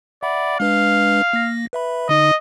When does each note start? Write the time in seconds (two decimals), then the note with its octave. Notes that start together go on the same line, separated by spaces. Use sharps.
0.23 D5 E5 F#5 B5
0.60 G#3 D4 B4 F5
1.33 A#3 A#6
1.73 B4 E5 B5
2.09 D3 D#4 D#5